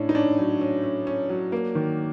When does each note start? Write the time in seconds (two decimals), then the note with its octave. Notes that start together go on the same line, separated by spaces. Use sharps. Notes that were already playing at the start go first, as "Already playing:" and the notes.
Already playing: A2 C#4 D4
0.09 D#4
0.15 C#4 D4
0.39 F#3
0.61 C#4
0.83 C#4
1.07 C#4
1.29 F#3
1.52 A#3
1.75 D#3